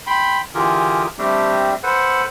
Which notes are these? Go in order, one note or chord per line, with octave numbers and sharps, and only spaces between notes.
G5 B5 C6
D3 E3 F4 G4 G#4 A#4
G3 A3 C4 D4 G4
A4 B4 C5 F#5